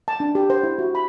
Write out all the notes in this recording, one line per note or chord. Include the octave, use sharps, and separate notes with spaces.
A5
D4
G4
C5
E4
F#4
B5